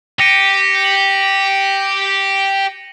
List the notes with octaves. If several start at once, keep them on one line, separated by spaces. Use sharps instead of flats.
G4 A#6 C#7 D#7
F#7